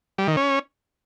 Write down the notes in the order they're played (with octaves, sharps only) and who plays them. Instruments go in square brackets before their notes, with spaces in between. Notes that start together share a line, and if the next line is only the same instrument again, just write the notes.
[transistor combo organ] G3
D#3
C#4